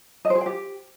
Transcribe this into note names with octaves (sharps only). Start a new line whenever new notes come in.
D#5
C5
G#4
G5
G4